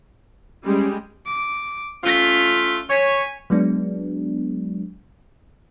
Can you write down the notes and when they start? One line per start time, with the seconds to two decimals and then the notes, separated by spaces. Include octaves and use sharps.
0.65 G3 G#3 C#4
1.26 D6
2.04 A3 C#4 F4 B6
2.90 C#5 G#5 B6
3.50 F#3 G#3 B3 D4